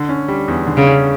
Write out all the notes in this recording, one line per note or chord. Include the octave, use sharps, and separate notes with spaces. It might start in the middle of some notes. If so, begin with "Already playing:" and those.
Already playing: D3
C#4
G3
E2
D3
C#3
C#4